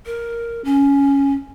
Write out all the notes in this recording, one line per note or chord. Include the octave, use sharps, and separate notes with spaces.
A#4
C#4